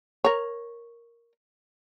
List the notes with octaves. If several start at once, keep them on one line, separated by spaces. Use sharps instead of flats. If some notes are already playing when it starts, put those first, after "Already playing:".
A#4 C#5